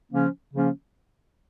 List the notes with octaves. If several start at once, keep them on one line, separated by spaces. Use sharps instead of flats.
C#3 F3 A#3 C#4
C#3 F3 A#3 C#4